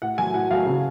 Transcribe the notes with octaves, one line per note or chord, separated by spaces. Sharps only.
A2 F#5
F#3 A3 G#5
A2 F#5
F#3 A3 F5
C#3